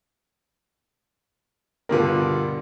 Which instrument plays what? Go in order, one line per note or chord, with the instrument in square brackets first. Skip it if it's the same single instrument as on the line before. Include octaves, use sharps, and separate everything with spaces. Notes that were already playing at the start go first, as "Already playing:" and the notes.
[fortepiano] G2 B2 D3 [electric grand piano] F4 A#4